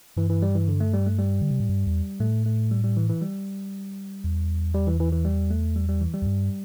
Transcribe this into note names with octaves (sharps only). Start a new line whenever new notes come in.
G2 E3
E3
G3
E3
D3
A3
G3
A3
G3
D3
C3
A2
G2
E2
A2 A3
A3
G3
G3
E3
E3
G3
E2
G3
E3
E3
E3
G3
A3
G3
G3
E3
G3
E2
G2